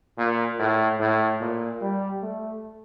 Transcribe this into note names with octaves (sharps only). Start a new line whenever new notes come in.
A#2
A2
A2
A#2
G3
A3